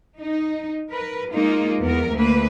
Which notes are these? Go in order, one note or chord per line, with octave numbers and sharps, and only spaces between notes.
D#4
A#4 B4
G#3 A#3 D#4 F4
E2 B3 A#4
D2 A#3 B4